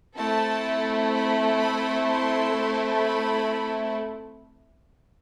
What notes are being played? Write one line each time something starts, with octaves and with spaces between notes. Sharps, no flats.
A3 C4 E4 A4 A5
B5
B5
C6
B5